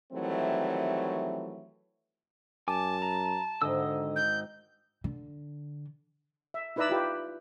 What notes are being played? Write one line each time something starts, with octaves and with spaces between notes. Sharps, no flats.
D#3 E3 F#3 G3 A3 C4
F#2 G#5 A5 D6
A#5
G#1 G#2 D3 D#5 D#6 E6
G6
D3
E5
D#4 E4 B4 D5 A#5 E6
F4 G4 B4